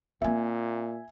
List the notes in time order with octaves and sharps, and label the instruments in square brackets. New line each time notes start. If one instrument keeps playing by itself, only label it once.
[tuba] A#2 [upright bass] A#3 C4 [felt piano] E5 G#5